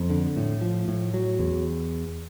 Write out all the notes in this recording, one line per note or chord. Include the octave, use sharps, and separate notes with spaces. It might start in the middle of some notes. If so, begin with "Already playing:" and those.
Already playing: F2
D3
A2
F3
A2
F#3
E2